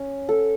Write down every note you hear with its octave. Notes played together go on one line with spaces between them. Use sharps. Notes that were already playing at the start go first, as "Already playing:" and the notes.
Already playing: C#4
A4